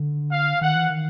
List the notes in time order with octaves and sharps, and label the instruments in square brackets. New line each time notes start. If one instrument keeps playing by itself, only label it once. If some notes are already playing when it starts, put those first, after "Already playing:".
Already playing: [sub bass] D3
[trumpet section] F5
[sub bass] D#3 [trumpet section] F#5
[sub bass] E3
D#3